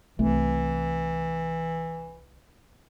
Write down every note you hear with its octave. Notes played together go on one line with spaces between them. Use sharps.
C2 E3 A3